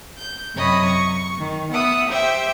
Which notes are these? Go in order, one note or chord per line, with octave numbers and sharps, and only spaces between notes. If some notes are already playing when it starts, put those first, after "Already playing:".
G6
F#2 C3 C#5 D#5 B5
C#6
D#3
B3 E5 F#5 D#6
G4 C5 E5 G5